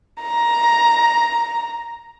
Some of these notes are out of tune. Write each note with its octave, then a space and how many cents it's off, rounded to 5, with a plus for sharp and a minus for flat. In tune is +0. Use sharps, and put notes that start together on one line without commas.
A#5 +10